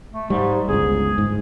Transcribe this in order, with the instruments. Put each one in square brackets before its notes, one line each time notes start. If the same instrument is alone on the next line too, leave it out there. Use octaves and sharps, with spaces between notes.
[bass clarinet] A3
[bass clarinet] G#2 [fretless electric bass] G3
[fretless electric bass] G1 C#2 [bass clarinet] G#4
[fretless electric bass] G#2